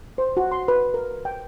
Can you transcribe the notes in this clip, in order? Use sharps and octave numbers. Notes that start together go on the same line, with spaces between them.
C5
F#4
C6
B4
A#4
G5